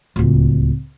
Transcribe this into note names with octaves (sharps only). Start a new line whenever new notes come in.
D1 C#2